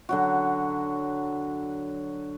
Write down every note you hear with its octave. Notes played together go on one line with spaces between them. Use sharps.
D3 F#3 F#4